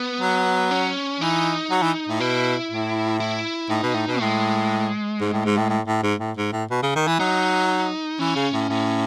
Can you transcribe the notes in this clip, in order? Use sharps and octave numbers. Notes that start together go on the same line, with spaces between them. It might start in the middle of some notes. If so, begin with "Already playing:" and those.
Already playing: B3
F#3
C#4
E3 D#4
F#3
E3
A2
B2 E4
A2
E4
A2 D#4
B2
A2
B2
A2 G#3
G#2
A2
G#2
A2
A2
A2
G#2
A2
G#2
A2
B2
C#3
D#3
E3
F#3 D#4
E3 C#4
C#3
A2
A2